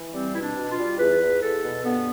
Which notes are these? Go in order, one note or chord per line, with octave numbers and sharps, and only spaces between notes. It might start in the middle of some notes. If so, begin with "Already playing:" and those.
Already playing: E3
G3 C4
B2 E4
D4
B2
F4
G3
E2 B4
E2
E2 A4
B2
G2 B3